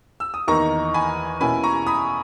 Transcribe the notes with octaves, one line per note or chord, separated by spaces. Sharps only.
E6
D#6
E2 D#3 A#3 D#4 A#5 C#6
G#5 B5
B2 A#3 C#4 E4 G#5 B5
A#5 C#6
B5 D#6